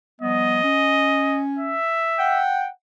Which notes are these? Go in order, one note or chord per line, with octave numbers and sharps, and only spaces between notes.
F3 G3 B3 D#5
C#4
E5
F#5 G5